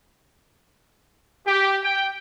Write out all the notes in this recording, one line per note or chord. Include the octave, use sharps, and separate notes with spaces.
G4
G5